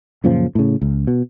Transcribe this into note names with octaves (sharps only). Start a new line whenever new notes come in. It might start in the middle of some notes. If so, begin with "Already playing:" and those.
F#2 A#2 C#3 F3
A2 C#3
C#2
B2